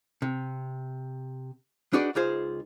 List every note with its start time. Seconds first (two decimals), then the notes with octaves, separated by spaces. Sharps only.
0.22 C3
1.93 D4 D#4 F#4 G#4 B4 D5
2.15 C#2 D#4 F4 G#4 C5